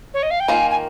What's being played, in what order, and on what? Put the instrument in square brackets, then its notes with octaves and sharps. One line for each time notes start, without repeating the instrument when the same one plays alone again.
[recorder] C#5
D#5
F5
G5
[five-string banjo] D#3 A#3 F4 [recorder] G#5
[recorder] G#5